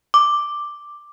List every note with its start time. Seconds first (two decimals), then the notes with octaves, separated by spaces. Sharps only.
0.14 D6